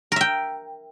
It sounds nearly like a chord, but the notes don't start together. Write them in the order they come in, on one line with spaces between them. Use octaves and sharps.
A#4 E5 G5